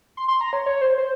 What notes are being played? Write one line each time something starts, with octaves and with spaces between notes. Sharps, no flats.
C6
C6
A#5
C#5
C#5
C5
C5